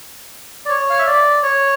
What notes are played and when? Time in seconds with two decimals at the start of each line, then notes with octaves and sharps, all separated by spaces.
0.65 D5
0.69 C#5
0.90 F5
0.99 E5
1.06 D5
1.42 C#5